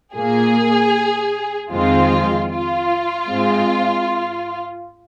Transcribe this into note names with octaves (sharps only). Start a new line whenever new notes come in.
A#2 A#3 G#4
F2 D#3 G#3 C4 F4
F4
G#2 G#3 C4